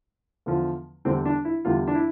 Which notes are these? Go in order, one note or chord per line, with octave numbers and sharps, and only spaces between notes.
E2 D3 F3
E2 D3 G3 C4
D4
E4
E2 D3 G3 F4
D4
E4